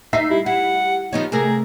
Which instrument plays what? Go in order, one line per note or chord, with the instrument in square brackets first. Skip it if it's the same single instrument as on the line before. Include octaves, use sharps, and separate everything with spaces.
[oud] D#4 [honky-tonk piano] E5 C7
[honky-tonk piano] G3 [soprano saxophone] E4
[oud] E4 [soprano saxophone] F#5
[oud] F3 B3 C#5 [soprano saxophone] D#4
[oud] C3 A3 A#4 [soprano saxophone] G#4